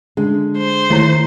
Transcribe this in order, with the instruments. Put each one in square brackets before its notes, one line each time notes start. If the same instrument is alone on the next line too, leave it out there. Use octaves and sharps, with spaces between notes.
[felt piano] D3 [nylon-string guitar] G#3
[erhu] C5
[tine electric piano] D#3 A3 E4 [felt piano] C#5 A#5